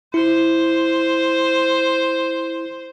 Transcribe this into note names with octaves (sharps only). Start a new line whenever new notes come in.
E4 C5